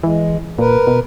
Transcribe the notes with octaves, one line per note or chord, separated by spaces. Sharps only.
E3 G#3
A#2 A#4 B4
B2